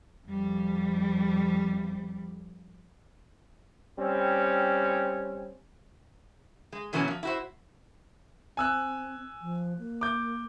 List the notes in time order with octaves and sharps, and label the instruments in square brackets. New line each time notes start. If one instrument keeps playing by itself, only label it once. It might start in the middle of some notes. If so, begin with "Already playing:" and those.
[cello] F2 G3
[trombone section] G3 C4 C#4
[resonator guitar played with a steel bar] G#3
B2 E3 F#3 A#3 C#4
F3
E4 F#4 C5
[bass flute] C4 [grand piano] G#5 E6 F#6
[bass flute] F3
A#3
[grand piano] D6 G6